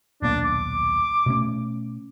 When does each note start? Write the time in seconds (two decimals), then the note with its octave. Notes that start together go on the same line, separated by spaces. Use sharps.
0.22 D#1 B1 A#3 D4
0.45 D6
1.26 B2 A3 C#4